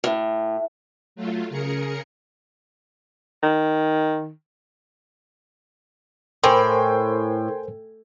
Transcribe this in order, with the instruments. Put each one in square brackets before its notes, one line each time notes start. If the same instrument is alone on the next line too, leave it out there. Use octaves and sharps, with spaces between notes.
[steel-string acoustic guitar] A2
[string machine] F#3 A3 F4
C#3 G#4 A#4 C#7
[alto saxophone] D#3
[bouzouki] A2 [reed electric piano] A#4 C5 [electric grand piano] G5 G#5 C6